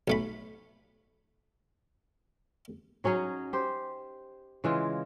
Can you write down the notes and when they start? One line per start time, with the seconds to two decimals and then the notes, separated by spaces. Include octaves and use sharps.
0.08 B1 A3 B5
3.04 F#3 C#4 D#4 G#4
3.53 G4 C5
4.64 C#3 E3 G#3 F4